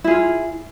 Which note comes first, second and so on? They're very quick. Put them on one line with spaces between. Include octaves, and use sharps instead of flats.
E4 G#4 F4